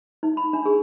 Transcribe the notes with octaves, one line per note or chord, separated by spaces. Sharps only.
D#4
B5
D4
G#4